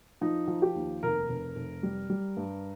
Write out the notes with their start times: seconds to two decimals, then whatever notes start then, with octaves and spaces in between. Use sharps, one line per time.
0.21 F3 D#4
0.48 F3
0.62 G4
0.75 D#2
1.03 F1 A#4
1.29 F1
1.56 F1
1.83 G3
2.10 G3
2.37 G2